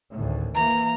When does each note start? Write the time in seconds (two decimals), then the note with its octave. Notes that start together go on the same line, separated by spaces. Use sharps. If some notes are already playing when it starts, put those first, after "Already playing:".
0.14 G#1 D2 A2
0.55 E3 A#3 A#5